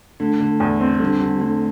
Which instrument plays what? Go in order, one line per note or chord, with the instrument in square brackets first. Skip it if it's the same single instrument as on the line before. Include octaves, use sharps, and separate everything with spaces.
[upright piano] D3 [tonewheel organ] A3
[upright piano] D3
E2
C4
[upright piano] D3 [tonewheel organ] G3
[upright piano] D3
[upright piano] D3 [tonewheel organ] A3